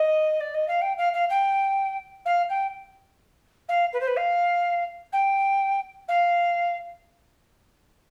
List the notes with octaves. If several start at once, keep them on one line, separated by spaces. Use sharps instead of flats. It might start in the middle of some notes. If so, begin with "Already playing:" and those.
Already playing: D#5
D5
D#5
F5
G5
F5
F5
G5
F5
G5
F5
B4
C5
B4
F5
G5
F5